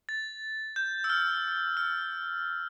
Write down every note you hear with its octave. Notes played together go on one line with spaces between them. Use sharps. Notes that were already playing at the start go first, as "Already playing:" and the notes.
A6
G6
E6
F6
F6